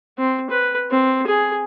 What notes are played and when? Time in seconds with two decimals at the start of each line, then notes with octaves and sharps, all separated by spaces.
0.18 C4
0.51 B4
0.91 C4
1.27 G#4